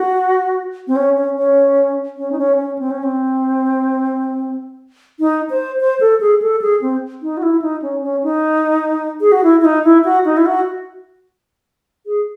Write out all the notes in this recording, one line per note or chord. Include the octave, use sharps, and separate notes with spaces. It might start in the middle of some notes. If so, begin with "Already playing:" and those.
Already playing: F#4
C4
C#4
C#4
C#4
C#4
D#4
C#4
C#4
C4
C#4
C4
D#4
C5
C5
A4
G#4
A4
G#4
C4
D#4
F#4
E4
D#4
C#4
C#4
D#4
G#4
F#4
E4
E4
D#4
E4
F#4
D#4
E4
F#4
G#4